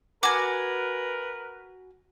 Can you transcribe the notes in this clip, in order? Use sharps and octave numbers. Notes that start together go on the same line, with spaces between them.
F#4 A#4 B4 G#5 D6